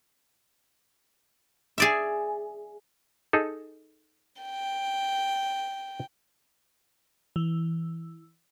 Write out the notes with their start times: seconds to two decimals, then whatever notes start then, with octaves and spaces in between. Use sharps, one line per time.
1.78 G#4 D5 E5
3.33 D#4 G#4 A4
4.42 G5
7.36 E3